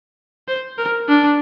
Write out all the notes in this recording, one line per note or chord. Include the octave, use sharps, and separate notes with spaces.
C5
A#4
D4